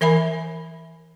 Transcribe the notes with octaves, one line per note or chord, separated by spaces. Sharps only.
E3 A#4 E5 G#5 B5